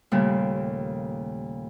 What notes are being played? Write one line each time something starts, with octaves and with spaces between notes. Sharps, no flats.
D#2 A#2 C#3 G3 A3